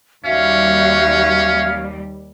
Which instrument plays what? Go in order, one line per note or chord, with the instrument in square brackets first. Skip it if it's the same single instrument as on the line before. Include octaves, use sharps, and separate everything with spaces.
[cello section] D#2 G3 [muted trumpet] C#4 [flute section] F#4 E5 [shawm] F5